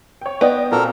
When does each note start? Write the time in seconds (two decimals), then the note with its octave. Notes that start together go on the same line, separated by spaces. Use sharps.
0.21 C#5 G5
0.41 B3 D5 D#5 G5
0.72 A#2 C4 F#4 A4 A#4